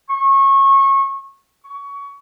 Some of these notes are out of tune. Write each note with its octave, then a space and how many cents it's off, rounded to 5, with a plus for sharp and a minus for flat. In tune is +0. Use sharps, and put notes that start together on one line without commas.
C#6 -25
C#6 +25